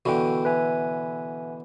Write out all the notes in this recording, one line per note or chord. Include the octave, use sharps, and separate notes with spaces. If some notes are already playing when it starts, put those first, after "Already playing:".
B2 D3 E3 F#4 A4 G5
B4 E5 G#5